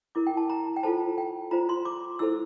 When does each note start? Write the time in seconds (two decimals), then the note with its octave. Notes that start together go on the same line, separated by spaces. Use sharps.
0.15 E4 A#4 D6
0.27 G5
0.37 A5
0.50 A#5
0.76 G5
0.83 F4 A4 C5 A5
1.18 G5
1.51 F4 C5 A#5
1.69 C6
1.85 D6
2.19 E4 A4 C5 E6